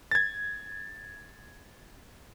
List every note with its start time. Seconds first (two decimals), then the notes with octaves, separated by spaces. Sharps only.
0.11 G#6 A6